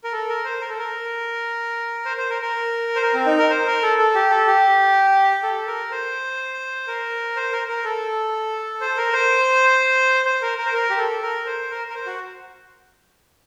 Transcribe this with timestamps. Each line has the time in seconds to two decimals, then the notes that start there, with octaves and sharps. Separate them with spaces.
0.04 A#4
0.12 A4
0.29 A#4
0.45 C5
0.61 A#4
0.69 A4
0.79 A#4
2.05 C5
2.17 C5
2.30 A#4
2.42 A#4
2.96 C5
3.02 A#4
3.14 C4
3.26 D#4
3.39 A#4
3.50 C5
3.66 A#4
3.83 A4
3.98 A4
4.14 G4
4.30 A4
4.47 G4
5.43 A4
5.67 A#4
5.91 C5
6.87 A#4
7.36 C5
7.52 A#4
7.68 A#4
7.84 A4
8.81 C5
8.97 A#4
9.13 C5
10.26 C5
10.42 A#4
10.58 A#4
10.66 C5
10.74 A#4
10.90 G4
10.98 A4
11.23 A#4
11.46 C5
11.70 A#4
11.90 A#4
11.94 C5
12.06 F#4